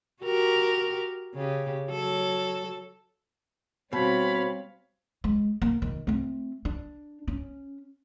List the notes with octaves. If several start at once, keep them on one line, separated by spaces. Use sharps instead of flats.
F#4 G4 A#4
C#3 G4
F#3 A4
B2 G3 C4 C#5 F5 B5
G#3
A#3
D#3
A3 C4
D4
C#4